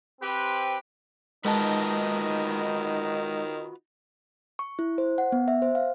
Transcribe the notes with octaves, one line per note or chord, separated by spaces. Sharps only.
C4 G4 B4
D#3 G#3 D#4 F4 F#4 B4 A5
C#6
E4
C5
F#5
B3
E5
C5
F5